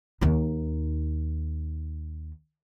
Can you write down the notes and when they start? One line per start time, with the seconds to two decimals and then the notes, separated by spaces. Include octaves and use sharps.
0.21 D#2 D#4